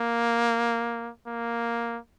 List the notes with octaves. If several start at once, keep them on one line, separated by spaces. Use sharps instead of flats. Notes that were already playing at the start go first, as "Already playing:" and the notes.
Already playing: A#3
A#3